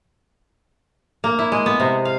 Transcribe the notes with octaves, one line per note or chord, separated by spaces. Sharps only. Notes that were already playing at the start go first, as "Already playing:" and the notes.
A#3
E4
G#3
B3
C3
F5